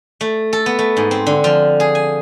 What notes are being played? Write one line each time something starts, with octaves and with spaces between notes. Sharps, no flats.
A3
A4
B3
A3
G#2
C4
D3
F3
G#4
G#5